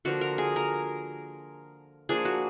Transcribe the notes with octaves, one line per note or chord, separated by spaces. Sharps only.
D3 F3 A#3 F#4
A#4
G#4
A#4
F3 A#3 D4 G#4
F#4